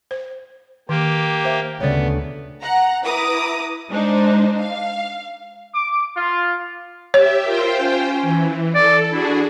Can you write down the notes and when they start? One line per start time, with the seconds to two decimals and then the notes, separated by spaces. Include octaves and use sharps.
0.11 C5
0.89 D#3 A#3 G4
1.45 C5 E5
1.80 D2 C#3 A3 B3 C#5 D5
2.62 F#5 A#5
3.04 E4 B4 A#5 D6 D#6
3.90 G#3 D4 D#4 C5
4.59 F5
5.75 D6
6.17 F4
7.14 G4 C#5 E5
7.45 F4 A#4 C5 G5
7.79 C#4
8.22 E3
8.75 A4 D5
9.10 D4 E4 F#4 G#4